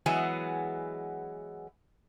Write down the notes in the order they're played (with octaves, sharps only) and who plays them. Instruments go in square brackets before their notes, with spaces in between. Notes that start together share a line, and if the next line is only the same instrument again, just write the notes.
[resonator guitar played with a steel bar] E3 F#3 G#3 B3 G#4